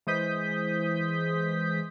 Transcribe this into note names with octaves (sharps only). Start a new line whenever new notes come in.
E3 G#3 C5 D#6 G6 B6